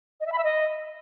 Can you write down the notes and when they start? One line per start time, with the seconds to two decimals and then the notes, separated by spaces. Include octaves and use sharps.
0.20 D#5
0.26 E5
0.32 B5
0.38 E5
0.43 D#5